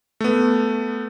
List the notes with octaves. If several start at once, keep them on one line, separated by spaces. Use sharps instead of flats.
A3 B3